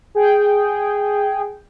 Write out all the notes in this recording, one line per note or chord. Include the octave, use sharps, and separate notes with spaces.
G#4 G5